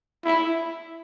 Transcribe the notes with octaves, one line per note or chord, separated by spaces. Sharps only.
E4